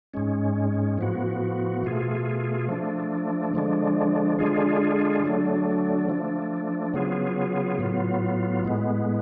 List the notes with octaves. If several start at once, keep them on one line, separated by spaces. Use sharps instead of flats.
G#2 G#3 C#4
A2 F3 B3 F#4
B2 A3 F4 G#4
F3 A3 D4
D3 F3 G#3 D4
D3 G#3 D4 F4 G#4
D3 F#3 A3 D4
F3 A3 D4
C#3 F#3 B3 F4 G#4
A2 F#3 B3 F4
A2 G#3 B3